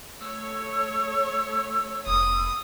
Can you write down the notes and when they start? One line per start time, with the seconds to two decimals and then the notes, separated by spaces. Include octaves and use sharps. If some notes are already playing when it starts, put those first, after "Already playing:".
0.21 A3 C#5 E6
2.06 F1 C4 D#6